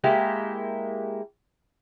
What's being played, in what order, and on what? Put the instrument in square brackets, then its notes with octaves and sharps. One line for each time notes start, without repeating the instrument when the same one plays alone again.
[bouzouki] G#3 A#3 E4 G4